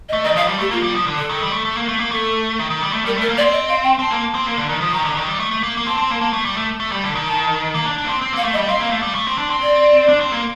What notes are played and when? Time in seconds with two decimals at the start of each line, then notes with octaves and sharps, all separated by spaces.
0.08 D#5
0.13 A3
0.24 D#3 D#5
0.35 F3 F5
0.47 G3
0.59 A3 G4
0.71 A#3 F4
0.83 G3
0.94 F3
1.07 D3
1.17 A4
1.29 D#3
1.42 G3
1.53 A3
1.65 A3
1.77 A#3
1.89 A3
2.00 A#3
2.11 A3 A4
2.59 D#3
2.70 D#3
2.81 G3
2.93 A3
3.05 G3 A#4
3.17 A3 A#4
3.29 A#3
3.37 D5
3.41 C4
3.52 D#5
3.68 F5
3.83 G5
3.99 C4 A5
4.11 A#3
4.35 C4
4.46 A#3
4.58 D3
4.69 D#3
4.81 F3
4.92 D#3 A#5
5.05 D3
5.17 D#3
5.28 G3
5.40 A3
5.51 A3
5.63 A#3
5.77 A#3
5.86 C4 A5
5.98 C4
6.10 A#3
6.21 A#3
6.33 A3
6.45 G3
6.57 A3
6.80 A3
6.92 G3
7.04 D3
7.15 D#3
7.27 A5
7.74 A#3 A#5
7.85 D4
7.98 D4
8.05 A#3
8.09 C4
8.21 C4
8.33 A#3 F5
8.44 A3
8.53 D#5
8.56 G3
8.67 C4 F5
8.80 A#3
8.91 A3
9.03 G3
9.15 A3
9.27 C4
9.38 D4
9.50 C4
9.62 D5
10.09 D4
10.20 C4
10.32 A#3